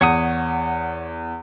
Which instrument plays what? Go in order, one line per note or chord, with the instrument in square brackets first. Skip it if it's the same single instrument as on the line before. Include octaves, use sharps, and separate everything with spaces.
[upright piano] E2 [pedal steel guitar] C#5 F#5 D#6